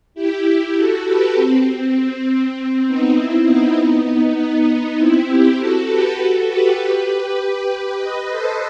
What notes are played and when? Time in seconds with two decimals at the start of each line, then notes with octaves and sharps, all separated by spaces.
0.14 E4 G4
0.75 F#4 A4
1.04 G4 B4
1.35 C4
2.25 C4
2.56 C4
2.86 B3 D#4
3.15 C4 E4
3.46 B3 D#4
3.76 B3 D#4
4.36 B3 D#4
4.96 C4 E4
5.26 E4 G4
5.57 F#4 A4
5.87 G4 B4
6.17 F#4 A4
6.47 G4 B4
7.37 G4 B4
7.97 B4 D#5
8.28 A4 C5